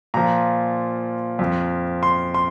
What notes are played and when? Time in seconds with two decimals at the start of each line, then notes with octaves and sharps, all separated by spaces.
0.14 A#2 F3 A#5
1.39 F2 F3
2.03 C6
2.34 C6